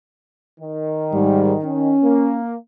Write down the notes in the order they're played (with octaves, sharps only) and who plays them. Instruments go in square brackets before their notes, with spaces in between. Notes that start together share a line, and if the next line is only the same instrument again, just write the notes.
[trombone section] D#3
[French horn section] G#2 G3
C#4
[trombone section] A#3